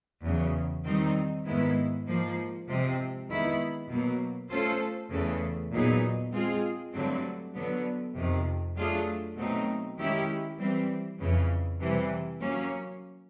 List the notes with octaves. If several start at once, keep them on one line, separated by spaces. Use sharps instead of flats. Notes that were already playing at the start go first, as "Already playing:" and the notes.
E2 C#3 F#3
D#3 G3 C4 D#4
G#2 D#3 G#3 B3 E4
G#2 F3 A#3
C3 F3 G#3 C4
D#3 G#3 B3 E4
B2 F#3 A#3
A3 C#4 F4 A4 C5
E2 C#3 E3 A3
A#2 F#3 B3 D#4 G#4
G#3 C4 F4 G#4
G2 D3 F#3 A3 C4
D3 F#3 B3
F2 C3 D#3
F#3 A3 D4 F4 G#4
B2 F#3 A3 C4 D#4
D#3 G#3 C#4 E4 G4
E3 G3 C4
F2 C#3 E3
C3 E3 G3
F#3 A#3 C#4